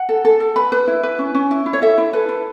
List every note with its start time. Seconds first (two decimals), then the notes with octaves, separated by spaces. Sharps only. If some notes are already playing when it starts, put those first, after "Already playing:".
Already playing: F#5
0.09 A4
0.25 A4
0.40 A4
0.56 B4 B5
0.72 B4
0.88 E4
1.03 B4
1.19 C#4
1.35 C#4
1.51 E4
1.66 E4
1.73 C#5
1.82 A4 E5
1.98 E4
2.13 A4 B4
2.29 E4